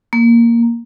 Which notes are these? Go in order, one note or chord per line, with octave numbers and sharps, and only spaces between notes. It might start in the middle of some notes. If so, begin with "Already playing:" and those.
A#3